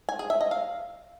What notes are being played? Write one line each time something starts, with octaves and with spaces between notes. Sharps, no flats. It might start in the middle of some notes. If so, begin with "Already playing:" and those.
G#5
G#4
E5
D#5
F5